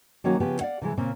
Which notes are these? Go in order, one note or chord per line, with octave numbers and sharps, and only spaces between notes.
D#3 F#3 A#3 C#4 F#4
C#3 F3 B3 G4
D5 F5 F#5
C3 E3 G#3
A#2 C#3 A#3 C4